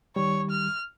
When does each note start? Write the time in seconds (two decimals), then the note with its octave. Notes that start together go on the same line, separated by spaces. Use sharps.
0.16 D#3 G3 C#5
0.51 F6